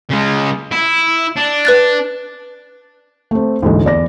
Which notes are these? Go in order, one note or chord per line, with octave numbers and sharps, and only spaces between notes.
C#3 G#3
E4
D4
B4 F#6 A6
A3 C4
A1 D2 G#2
E2 D5 A#6